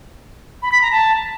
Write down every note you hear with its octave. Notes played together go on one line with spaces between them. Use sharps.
B5
B6
A#5
A5